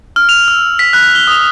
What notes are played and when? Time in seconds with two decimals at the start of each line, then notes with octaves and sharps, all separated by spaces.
0.16 F6
0.29 F7
0.48 E6
0.79 B6
0.93 F#6
1.15 G7
1.27 D#6